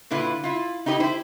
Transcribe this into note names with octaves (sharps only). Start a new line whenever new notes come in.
A#2 D3 E4 F4 B4
E4 F4
D#4 E4 G4 C#5 D#5
E4 G4 C5